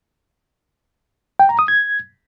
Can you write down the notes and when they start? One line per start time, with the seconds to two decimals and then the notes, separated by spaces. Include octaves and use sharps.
1.40 G5
1.49 A#5
1.59 D#6
1.68 G#6